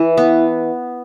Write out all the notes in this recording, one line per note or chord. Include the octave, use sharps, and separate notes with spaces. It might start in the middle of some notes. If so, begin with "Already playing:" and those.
Already playing: E3 E4
B3